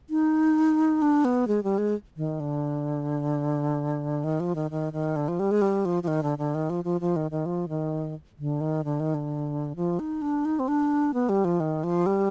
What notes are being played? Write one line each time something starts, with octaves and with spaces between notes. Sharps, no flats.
D#4
D4
B3
G#3
G3
G#3
D#3
D3
D#3
F3
D#3
D#3
D#3
D3
F3
G3
G#3
G3
F3
F3
D#3
D3
D3
D#3
F3
F3
F3
D#3
D#3
F3
D#3
D3
D#3
D3
D#3
D3
F3
D#4
D4
D#4
C4
D4
B3
G3
F3
D#3
F3
G3